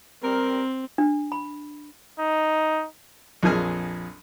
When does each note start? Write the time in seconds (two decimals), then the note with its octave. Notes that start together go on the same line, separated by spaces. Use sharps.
0.22 G3 C4 A#4
0.98 D4
1.32 B5
2.20 D#4
3.43 A#1 F2 F3 G#4 G#5 F6